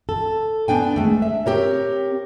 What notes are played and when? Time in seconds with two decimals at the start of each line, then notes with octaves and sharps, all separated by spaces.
0.09 A4
0.68 B3 D4 G5 G#5
0.96 G#3 A3
1.22 E5
1.46 C4 G4 A#4 C#5